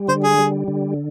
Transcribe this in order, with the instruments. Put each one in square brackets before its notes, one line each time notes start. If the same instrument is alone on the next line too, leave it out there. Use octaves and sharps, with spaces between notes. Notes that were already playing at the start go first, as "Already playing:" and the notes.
Already playing: [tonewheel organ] G3
[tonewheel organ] D3 [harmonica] C5
[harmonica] G#4
[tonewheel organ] G3
D3